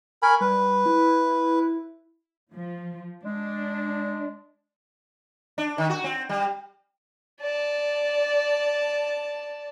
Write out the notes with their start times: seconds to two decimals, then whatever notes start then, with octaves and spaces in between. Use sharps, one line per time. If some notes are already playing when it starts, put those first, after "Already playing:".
0.22 A#4 G#5 B5 C#6
0.41 G3 B4
0.86 E4
2.52 F3
3.23 G#3 D4
5.58 D4
5.78 D#3
5.90 F#4
6.04 C4
6.29 G3
7.41 D5 A5